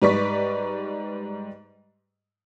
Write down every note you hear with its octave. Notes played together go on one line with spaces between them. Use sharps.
G#2 G3 B4 D5 C#6 B6